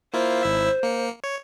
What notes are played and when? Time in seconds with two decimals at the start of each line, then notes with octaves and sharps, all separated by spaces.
0.14 A#3 E4 F4 C5
0.43 G#1 E4 E5
0.83 A#3 C#7
1.24 C#5